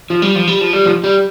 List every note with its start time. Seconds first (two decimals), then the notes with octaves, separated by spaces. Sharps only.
0.10 F3
0.22 G3
0.35 F3
0.48 G3
0.61 F3
0.73 G3
0.85 F3
1.04 G3